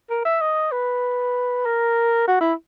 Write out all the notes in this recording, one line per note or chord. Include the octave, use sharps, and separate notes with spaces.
A#4
E5
D#5
B4
A#4
F#4
E4